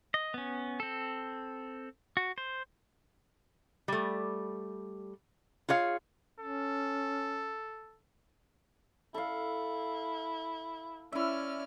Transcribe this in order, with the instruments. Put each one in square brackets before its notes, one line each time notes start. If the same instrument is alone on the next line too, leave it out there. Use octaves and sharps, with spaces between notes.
[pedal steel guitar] D#5
B3 C#4
C4 A4
F#4
C5
[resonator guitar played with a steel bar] G3 A3
F4 G#4 C#5 F5
[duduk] C#4 [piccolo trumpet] A4
[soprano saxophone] E4 [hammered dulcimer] A4 F5
[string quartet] C#4 D5 F6 [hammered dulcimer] E4 E5